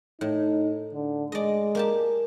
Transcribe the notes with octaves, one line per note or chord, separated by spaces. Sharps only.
A2 D#4
D3
G#3 D5 D#5
A#3 G4 A5